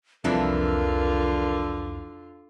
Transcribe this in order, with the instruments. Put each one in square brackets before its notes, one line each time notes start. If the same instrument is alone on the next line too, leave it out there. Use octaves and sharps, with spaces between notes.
[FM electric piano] C2 F2 [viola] D3 F4 [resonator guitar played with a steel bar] E3 A#3 D4 [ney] A#4